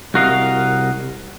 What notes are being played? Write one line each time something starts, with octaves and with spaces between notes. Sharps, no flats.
C2 C3 F#4 A#4 D#5 F5